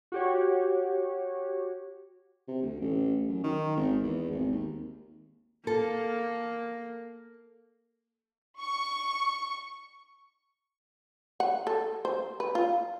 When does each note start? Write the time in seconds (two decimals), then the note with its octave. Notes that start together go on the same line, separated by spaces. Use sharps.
0.12 F#4 G4 C#5
2.48 C3
2.62 D2
2.80 A1
3.28 F#2
3.43 D#3
3.77 G#1
4.03 E2
4.31 G#1
4.52 D#2
5.67 A#3 A4
8.60 C#6
11.40 F#5
11.67 A4
12.05 C5
12.40 B4
12.55 F4